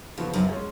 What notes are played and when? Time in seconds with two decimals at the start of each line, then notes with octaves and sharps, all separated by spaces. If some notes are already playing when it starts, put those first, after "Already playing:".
0.18 F2 C#3 F3 B3 F#4
0.33 F#2
0.49 G#3 C#4 G#4